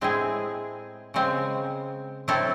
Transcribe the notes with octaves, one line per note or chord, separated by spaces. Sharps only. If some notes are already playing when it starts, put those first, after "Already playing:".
A2 G#3 C4 E4 G#4
C#3 G#3 C4
F#3 C4 E4 A4